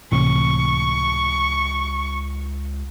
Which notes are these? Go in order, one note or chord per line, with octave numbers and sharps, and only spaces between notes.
C#2 A2 C3 E3 C#6